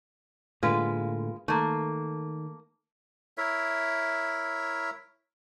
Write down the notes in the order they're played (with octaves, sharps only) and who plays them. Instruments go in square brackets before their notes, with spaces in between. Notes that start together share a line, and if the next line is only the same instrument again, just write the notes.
[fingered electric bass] A2 D3 A#3 [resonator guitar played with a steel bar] G#3 F4 B4
[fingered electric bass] D#3 [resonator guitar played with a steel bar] A3 A#3
[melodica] E4 A#4 C#5 E5